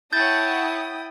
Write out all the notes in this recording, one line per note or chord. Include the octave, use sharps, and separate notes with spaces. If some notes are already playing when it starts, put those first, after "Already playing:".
E4 C#5 F#5 G5 A5 D#6 G6 A6